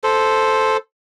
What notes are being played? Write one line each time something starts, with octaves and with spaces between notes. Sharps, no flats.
A4 C5